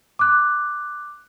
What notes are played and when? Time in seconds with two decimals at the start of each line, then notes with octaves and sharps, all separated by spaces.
0.19 D6 F#6